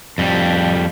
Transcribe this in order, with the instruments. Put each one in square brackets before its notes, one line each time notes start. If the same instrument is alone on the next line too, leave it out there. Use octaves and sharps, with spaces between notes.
[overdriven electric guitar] F2 G3